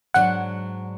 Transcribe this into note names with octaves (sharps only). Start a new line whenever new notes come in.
G#2 F#3 D4 F#5